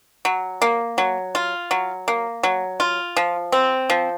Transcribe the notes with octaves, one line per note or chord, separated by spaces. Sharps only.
F#3
A#3
F#3
F4
F#3
A#3
F#3
F4
F3
C4
F3